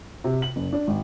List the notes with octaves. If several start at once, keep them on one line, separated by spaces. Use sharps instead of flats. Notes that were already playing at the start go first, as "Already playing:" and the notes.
C3
F#7
F#1
D4
G#1